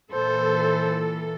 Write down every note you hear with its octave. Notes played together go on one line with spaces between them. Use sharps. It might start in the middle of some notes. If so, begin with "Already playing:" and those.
A#2 E3 A4 C5